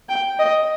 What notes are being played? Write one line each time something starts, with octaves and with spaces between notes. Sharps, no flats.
G5
D#5